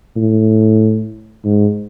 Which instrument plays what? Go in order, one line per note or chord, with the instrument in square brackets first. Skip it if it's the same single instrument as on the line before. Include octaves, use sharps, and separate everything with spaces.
[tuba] A2
G#2